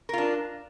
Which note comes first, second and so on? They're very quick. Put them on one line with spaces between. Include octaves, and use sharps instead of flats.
A#4 F4 D4